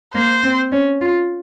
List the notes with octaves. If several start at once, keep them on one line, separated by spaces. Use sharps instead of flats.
A#3 C5
C4
C#4
F4